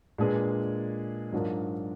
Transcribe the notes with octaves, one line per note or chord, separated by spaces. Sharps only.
A#2 G#3 D4 G#4 B4
G#2 F#3 D4 F4 A#4